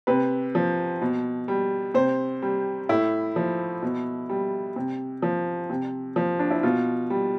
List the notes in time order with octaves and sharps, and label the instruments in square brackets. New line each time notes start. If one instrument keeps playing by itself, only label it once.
[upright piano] C3 B4
F3
B2
G3
C3 C5
G3
A2 E4
F3
B2
G3
C3
F3
C3
F3
D4
E4
B2 F4
G3